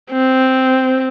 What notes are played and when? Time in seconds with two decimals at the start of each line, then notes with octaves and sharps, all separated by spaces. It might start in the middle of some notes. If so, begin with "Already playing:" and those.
0.12 C4